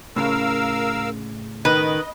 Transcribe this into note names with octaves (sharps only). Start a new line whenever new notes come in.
A2 C#3 A#4 F5 E6
D#3 B4 D#5